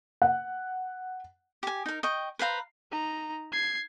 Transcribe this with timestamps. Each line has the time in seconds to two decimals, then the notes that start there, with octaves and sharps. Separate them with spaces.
0.22 F#5
1.63 G4 G#5
1.86 D#4 A#4
2.03 D#5 G5 C#6
2.39 B4 C5 F5 A#5
2.91 D#4 A#5
3.52 G#6 C7